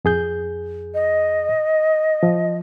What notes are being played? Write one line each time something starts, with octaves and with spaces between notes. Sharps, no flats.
F2 G#4 G6
D#5
F3